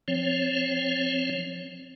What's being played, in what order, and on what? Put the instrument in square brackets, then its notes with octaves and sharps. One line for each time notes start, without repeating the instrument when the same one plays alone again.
[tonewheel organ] F3 C4 C#5